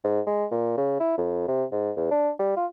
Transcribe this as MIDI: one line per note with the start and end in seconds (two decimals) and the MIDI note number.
0.04 0.21 44
0.27 0.45 56
0.52 0.77 46
0.77 0.99 49
1.00 1.17 64
1.18 1.44 41
1.48 1.64 48
1.72 1.91 44
1.97 2.10 40
2.11 2.30 62
2.39 2.56 55
2.57 2.66 65